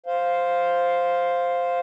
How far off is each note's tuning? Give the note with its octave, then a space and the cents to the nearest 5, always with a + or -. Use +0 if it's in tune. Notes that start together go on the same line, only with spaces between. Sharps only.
C5 +0 F5 +0